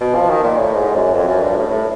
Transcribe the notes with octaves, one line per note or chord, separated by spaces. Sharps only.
B2
F3
D#3
A#2
A2
G#2
F#2
F2
F#2
G2
A2
A2